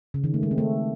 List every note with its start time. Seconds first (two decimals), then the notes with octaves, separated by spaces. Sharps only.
0.14 C#3
0.24 D#3
0.34 A3
0.43 G#3
0.51 C4
0.58 A3